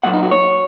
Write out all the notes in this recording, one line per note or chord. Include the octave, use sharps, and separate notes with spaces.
A#2 F#3 F#5
D#4
F#4
C#5